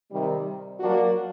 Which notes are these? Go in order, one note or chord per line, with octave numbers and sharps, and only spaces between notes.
C3 D#3 G3
F#3 A#3 D4 F#4